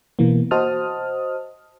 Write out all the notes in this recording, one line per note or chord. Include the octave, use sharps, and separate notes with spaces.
B2 E3 A#3
F#4 C5 D#5 A5 D#6 F6